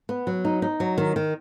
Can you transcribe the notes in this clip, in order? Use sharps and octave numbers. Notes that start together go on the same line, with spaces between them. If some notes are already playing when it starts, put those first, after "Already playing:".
B3
F#3
D#4
D#4
F#3
D#3
D#3